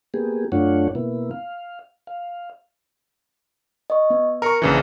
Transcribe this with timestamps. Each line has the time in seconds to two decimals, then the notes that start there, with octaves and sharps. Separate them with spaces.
0.14 A#3 B3 G4 G#4
0.52 F#2 A3 D4 F4 C#5 F#5
0.95 B2 A#3 B3 E4
1.31 F5
2.07 F5
3.90 D#5 C#6
4.10 B3
4.42 A#4 A#5 C#6 C#7
4.62 A#1 C#3 E3